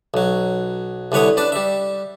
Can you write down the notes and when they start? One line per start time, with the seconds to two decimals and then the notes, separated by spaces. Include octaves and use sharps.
0.14 B1 F#3
1.12 C2 D3 B4 C#5 D#6
1.37 D4 B4 A5
1.52 G3 E5